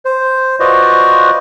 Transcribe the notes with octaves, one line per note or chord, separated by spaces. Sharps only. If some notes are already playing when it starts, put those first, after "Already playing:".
C5
F4 F#4 B4 C5 D5 D#5